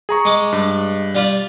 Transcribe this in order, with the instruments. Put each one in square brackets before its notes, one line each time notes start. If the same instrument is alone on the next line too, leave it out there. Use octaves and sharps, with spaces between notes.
[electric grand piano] G#4 A#5 C#6
[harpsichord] G#3 D6
[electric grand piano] G2
[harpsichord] G3 F4